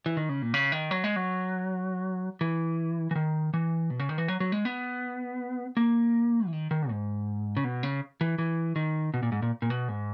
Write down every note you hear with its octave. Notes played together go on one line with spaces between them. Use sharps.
E3
D#3
C#3
A#2
C#3
D#3
F#3
G#3
F#3
E3
E3
D#3
E3
B2
C#3
D#3
E3
F#3
F#3
G#3
B3
A#3
E3
D#3
D#3
G#2
C#3
B2
C#3
E3
E3
D#3
B2
A#2
G#2
A#2
A#2
B2
G#2